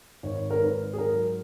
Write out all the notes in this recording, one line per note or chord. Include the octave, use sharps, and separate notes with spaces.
G#1 C#5
A#4
G#2 B4
G#4
F#3 A#4